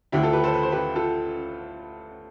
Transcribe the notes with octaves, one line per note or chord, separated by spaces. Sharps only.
D2 D3 E4 G4
F4 A4
G4 B4
A4 C5
B4
C5
G4 B4
F4 A4